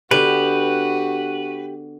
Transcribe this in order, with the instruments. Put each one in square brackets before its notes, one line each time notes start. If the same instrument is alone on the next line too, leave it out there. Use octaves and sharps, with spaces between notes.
[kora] D3 B3 G5 [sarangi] F#4 [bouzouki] G4 [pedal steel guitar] B4